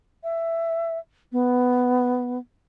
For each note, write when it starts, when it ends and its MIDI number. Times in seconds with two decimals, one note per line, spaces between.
0.24 0.99 76
1.32 2.38 59